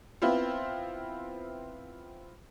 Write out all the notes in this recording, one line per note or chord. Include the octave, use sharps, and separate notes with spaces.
B3 C4 E4 F4